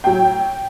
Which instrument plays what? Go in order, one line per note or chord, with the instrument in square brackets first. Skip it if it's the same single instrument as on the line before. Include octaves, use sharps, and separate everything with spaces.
[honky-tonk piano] A2 F#3 G5